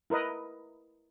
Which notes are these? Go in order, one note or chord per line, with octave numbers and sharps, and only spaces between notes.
E4 A#4 B4 D#5